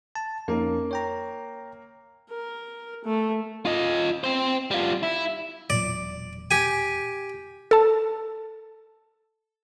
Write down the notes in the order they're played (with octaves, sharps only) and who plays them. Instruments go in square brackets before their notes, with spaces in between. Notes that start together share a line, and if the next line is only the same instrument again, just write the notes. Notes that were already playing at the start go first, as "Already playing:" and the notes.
[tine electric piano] A5
[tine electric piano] F2 C#4 D#4 [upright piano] A#3
[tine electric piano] C#5 G5 A#5
[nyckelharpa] A#4
A3
[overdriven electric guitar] F4 D#5
C4 C5
G3 F4
E4
[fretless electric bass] E1 A#2 F#3 [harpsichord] D5
[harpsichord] G4 G#5
[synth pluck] A4 A5